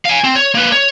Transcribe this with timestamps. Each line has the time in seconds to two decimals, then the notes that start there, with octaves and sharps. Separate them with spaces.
0.05 F5 G#5
0.24 C4
0.35 C#5
0.55 A#3 B4
0.72 C#5